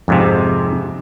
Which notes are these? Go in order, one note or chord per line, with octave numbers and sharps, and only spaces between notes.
F2 G#2 C3